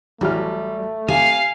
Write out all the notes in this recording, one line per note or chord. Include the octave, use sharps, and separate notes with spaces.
A1 F#3 G3 A3 F6
C3 F5 G#5